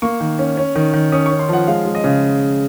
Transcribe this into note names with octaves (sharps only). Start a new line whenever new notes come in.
A#3 C#6
D#3
C#4
C#4
D#3
D#3
C#4 D#6
C#4 C#6
C6
F3 F#5
G#3 F5
G#3
D#5
C#3